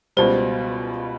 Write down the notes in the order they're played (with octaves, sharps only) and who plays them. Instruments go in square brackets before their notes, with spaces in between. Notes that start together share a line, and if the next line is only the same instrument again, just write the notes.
[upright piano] C#2 B2 G3 [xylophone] C5